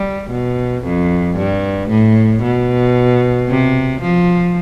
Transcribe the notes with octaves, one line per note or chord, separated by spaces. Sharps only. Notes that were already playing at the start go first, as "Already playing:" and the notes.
Already playing: G3
B2
F2
G2
A2
B2
C3
F3